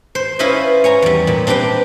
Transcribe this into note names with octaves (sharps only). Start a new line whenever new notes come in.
C5
C#4 E4 F4 B4 C5 D#5
C#5 G#5 A#5
E2 G3
A#2
C4 D4 G4 B4 G5